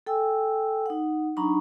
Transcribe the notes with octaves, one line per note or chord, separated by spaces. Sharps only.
A4 G5 G#5 E6
D#4 F#5
F#3 D4 D#4 A#5 B5 C#6